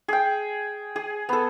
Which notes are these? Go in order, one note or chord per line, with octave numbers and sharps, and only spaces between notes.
G#4 G5
G#4
B3 A4